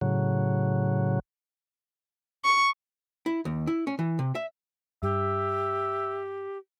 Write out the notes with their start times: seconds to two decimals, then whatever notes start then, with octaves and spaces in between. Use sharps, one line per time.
0.01 A2 C#3 F#3
2.45 C#6
3.26 E4
3.45 D#2
3.67 E4
3.87 C#4
3.99 E3
4.19 C3
4.35 E5
5.03 G2 G4 E5